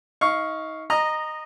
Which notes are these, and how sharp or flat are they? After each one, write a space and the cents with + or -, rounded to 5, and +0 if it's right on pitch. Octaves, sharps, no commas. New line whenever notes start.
D#4 +30 F5 +0 C#6 +0
D#5 -15 A#5 +0